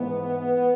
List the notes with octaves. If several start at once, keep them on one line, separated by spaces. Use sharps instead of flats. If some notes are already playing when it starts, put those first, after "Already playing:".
Already playing: G#2 E3 B3